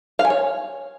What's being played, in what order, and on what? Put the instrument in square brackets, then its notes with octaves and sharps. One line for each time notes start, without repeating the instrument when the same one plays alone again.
[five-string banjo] F5
G#5
C#5